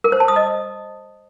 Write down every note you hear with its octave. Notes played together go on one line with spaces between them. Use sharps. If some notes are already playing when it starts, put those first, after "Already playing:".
A#4
C5
A5
D#6
D#5